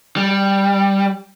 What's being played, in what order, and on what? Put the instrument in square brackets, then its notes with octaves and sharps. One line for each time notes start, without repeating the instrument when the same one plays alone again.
[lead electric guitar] G3